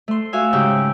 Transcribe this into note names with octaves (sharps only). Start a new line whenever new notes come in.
A3 C6
F#4 E5 F5 G#5 E6
G#2 C#3 G4 G5 E6